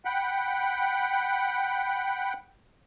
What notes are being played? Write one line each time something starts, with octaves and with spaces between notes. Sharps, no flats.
F#5 G5 B5